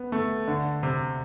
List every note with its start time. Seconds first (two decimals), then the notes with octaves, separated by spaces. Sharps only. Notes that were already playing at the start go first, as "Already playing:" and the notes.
Already playing: B3
0.12 A3
0.48 D3
0.83 C3